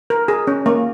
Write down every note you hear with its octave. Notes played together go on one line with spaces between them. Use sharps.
A#4
G#4
C#4
A#3